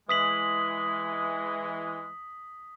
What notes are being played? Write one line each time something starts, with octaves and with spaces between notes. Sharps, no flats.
E3 G#3 D#6 B6 F#7